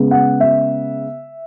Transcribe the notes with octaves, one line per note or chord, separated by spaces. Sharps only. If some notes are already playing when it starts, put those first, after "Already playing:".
Already playing: C#3 G#3 B3
F#5
E5